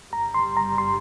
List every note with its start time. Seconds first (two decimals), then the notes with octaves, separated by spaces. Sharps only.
0.13 G1 G2 G3 A#5
0.34 C6
0.57 A#5
0.78 C6